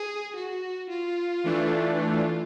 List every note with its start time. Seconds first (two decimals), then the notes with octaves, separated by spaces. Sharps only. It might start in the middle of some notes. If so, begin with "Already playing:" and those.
Already playing: G#4
0.36 F#4
0.89 F4
1.44 E3 A3 D4
1.98 F4